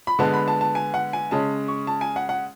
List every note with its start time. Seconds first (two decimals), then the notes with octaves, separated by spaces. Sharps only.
0.07 B5
0.19 D3 G#3 B3 A5
0.33 B5
0.48 A5
0.61 A5
0.75 G#5
0.94 F#5
1.13 G#5
1.31 C#3 G#3 C#4 A5
1.68 C#6
1.87 A5
2.01 G#5
2.16 F#5
2.29 F#5